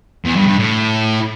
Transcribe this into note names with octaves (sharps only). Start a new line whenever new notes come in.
E2
G2
G2
A2